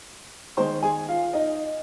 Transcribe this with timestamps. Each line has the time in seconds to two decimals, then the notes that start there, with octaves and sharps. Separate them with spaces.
0.57 D#3 G#3 C5 C6
0.83 G#4 G#5
1.09 F4 F5
1.33 D#4 D#5